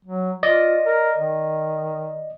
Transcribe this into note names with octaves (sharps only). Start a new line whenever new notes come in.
F#3
F4 D5 D#5
A#4
D#3